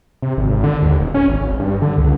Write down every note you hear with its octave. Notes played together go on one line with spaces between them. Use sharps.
C3
G#1
D3
D#2
D#1
C#4
G#1
G#1
G2
D3
C#2